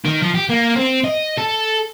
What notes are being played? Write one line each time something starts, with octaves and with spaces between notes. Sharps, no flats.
D#3
F3
G4
A#3
C4
D#5
A4